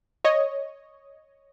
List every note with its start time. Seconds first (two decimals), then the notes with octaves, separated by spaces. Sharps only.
0.24 C#5 D#5